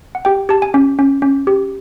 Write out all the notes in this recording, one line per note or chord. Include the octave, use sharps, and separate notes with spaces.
F#5
G4 G5
G4 A5
G#5
C#4
C#4
C#4
G4